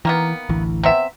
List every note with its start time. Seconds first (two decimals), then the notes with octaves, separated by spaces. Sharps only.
0.05 D#3 E3 A#3 B3
0.49 A1 D2 E3
0.83 C3 B3 E5